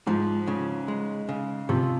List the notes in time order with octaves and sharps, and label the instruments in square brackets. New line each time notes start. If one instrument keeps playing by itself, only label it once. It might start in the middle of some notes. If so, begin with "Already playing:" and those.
[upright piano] G#2 [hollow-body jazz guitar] F3
[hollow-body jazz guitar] C#3
G#3
C#3
[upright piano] C3 [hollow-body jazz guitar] F3